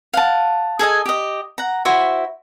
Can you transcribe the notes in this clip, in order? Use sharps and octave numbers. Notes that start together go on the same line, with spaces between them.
F5 F#5 A5
G#4 A4 D#5 G#5
G4 D#5
F#5 A#5
E4 F#4 C5 E5